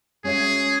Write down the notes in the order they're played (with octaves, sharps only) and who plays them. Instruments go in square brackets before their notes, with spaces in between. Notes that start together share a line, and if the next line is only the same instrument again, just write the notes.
[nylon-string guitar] G#3 C#4 F#4 C#5 E5 [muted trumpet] G#4